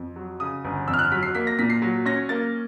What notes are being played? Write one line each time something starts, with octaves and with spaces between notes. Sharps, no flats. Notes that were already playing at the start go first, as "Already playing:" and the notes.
Already playing: F2
F#3
C#3 D#6
G1
F2 E6
F6
F#6
F#3 B6
C7
A#3 B6
A#6
A#2 B6
C7
F#3
C#4 A#6
A#3 A6